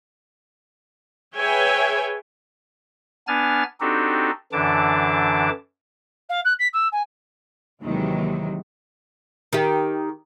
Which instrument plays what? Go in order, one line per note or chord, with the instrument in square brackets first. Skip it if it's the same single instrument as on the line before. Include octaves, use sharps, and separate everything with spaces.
[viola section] G#4 B4 C#5 E5 G5 G#5
[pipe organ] B3 D4 G#5 F6 A6
C4 D4 D#4 F#4 G4 A4
F#2 D3 E3 D4 A5 D6
[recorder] F5
F#6
B6
E6
G#5
[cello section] D#2 C3 D#3 E3 F#3 G#3
[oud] D#3 G4